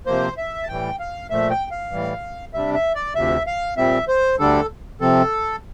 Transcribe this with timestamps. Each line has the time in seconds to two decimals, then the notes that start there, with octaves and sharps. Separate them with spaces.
0.06 C3 F3 A#3 C5
0.37 E5
0.63 A5
0.68 A2 E3 G3 G5
0.99 F5
1.30 A#2 F3 A3 E5
1.50 G5
1.71 F5
1.92 A2 E3 G3
2.54 C3 G3 D4 E5
2.74 E5
2.95 D5
3.15 D2 C3 F3 E5
3.47 F5
3.77 A#2 G3 C4 E5
4.08 C5
4.39 D2 D3 G3 D4 A4
5.01 C3 F3 C4 A4